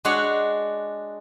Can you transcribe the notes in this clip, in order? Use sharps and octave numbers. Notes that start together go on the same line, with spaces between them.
G#3 D4 F#4 C#5 F#5